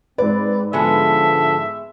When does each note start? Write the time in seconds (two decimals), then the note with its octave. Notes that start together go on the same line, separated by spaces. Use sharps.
0.18 G#2 C4 B4 D5
0.73 D3 F3 G#3 B3 F#4 A4 E5